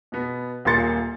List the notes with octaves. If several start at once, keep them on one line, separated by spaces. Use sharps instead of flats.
B2 B3
D#1 A#2 A#3 C6 A6 C#7